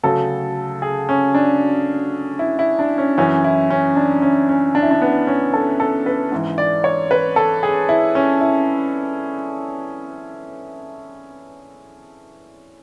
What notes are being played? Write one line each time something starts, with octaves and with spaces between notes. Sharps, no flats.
D2 C#3 F#3 A4
G#4
C#4
D4
E4
E4
D4
C#4
F#2 E3 C#4
E4
C#4
D4
C#4
C#4
D4
E4
D4
B3
C#4
A4
A4
B4
G#2 E3
D5
C#5
B4
A4
G#4
E4
C#4
E4